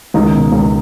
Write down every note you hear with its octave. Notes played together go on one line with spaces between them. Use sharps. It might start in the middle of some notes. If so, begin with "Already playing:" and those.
C#2 D#3 D#4
B2
C#2